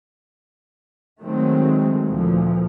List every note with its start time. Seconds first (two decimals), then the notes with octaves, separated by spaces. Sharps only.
1.21 D#3 F#3 G#3 A3 C4
2.07 D2 A#2 E3 F3